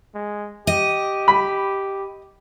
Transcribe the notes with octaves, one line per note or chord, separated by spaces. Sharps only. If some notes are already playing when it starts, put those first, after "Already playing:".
G#3
G4 D#5
B5